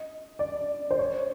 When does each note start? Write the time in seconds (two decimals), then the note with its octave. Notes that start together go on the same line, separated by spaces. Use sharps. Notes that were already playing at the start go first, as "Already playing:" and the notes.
Already playing: D#5
0.39 D5
0.91 C5
0.99 C#5